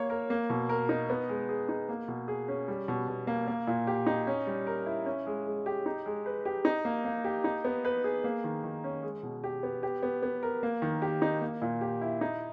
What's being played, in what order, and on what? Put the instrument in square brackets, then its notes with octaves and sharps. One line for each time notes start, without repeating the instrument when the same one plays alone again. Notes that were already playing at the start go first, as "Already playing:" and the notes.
Already playing: [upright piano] A#3 C#5
A#4
A#3
B2
A#4
D#4
B3
G#3
G#4
D#4
A#3
B2
G#4
C#4
G3
B2
B2
A#3
A#3
A#2
G4
D#4
C#4
G3
A#4
E4
C#4
G#3
G#3
G4
D#4
G#3
B4
G4
D#4
A#3
A#3
G4
D#4
B3
B4
G#4
A#3
D#3
D#3
C#4
G#3
B2
G4
B3
G4
B3
B3
A#4
A#3
D#3
G4
D#4
A#3
A#2
G4
E4
D#4